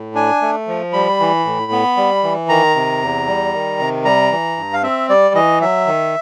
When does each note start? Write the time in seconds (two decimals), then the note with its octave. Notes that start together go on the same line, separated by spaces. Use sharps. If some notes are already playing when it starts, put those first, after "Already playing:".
Already playing: A2
0.15 D4 G#5
0.41 A3
0.67 F3
0.93 G3 B5
1.20 E3
1.45 A2
1.72 B3
1.97 G3
2.24 E3
2.49 D#3 A#5
2.76 C3
3.01 E2
3.27 G3
3.54 D#3
3.80 C3
4.05 G3 A#5
4.31 E3
4.57 G2
4.73 F5
4.83 C4 E5
5.09 G3 D5
5.35 E3 D#5
5.61 F#3 E5
5.87 D#3